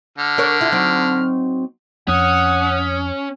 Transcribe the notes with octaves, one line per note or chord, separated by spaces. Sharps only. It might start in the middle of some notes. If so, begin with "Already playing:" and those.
D3 F6
D4 A#4 C#5
E4 F4
F#3 C4 D#4
F2 C#4 F#5 D#6